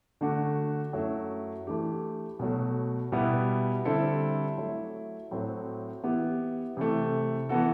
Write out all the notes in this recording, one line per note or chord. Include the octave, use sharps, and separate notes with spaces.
D3 A3 D4 F#4
F#2 F#3 A3 E4
E3 A3 D4 G4
B2 F#3 A3
B2 G3 B3 E4 G4
D3 G3 C4 E4 A4
F#3 A3 E4
A2 F#3 A3 C4
E3 B3 E4 G4
C3 E3 A3
E3 B3 F#4 A4